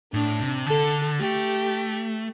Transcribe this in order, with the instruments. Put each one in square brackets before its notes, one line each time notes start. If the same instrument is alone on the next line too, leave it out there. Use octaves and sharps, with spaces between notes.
[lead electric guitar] A2 [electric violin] D4
[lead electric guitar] C3
[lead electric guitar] D3 [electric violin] A4
[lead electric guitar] A3 [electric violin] G4